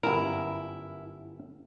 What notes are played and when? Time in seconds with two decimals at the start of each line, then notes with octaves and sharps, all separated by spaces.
0.03 G1 F#2 E4 A#4